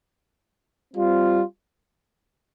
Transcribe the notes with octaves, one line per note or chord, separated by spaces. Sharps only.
G3 C4 F4